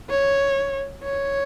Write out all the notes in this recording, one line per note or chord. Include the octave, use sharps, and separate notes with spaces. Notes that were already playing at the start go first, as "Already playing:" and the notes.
C#5
C#5